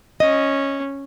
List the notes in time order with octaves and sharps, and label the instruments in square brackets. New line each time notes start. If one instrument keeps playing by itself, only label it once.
[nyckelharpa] C#4 [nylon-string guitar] D#5